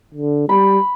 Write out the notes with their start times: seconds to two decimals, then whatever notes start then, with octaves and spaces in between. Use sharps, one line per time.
0.14 D3
0.49 G3 B5